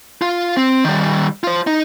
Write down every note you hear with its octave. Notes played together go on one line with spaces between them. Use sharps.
F4
C4
D#3 G3
F4 C5
D#4